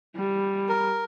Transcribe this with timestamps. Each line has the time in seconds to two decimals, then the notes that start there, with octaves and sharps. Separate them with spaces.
0.16 G3
0.69 A#4